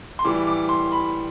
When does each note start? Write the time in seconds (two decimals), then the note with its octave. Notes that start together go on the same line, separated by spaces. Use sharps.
0.19 C6
0.25 A2 E3 G3 D6
0.47 D6
0.69 C6
0.92 B5